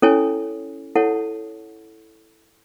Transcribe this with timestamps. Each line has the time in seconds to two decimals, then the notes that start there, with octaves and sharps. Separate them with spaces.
0.02 C#4 E4 A4 C#5 G#5
0.96 E4 A4 C#5 F#5 A5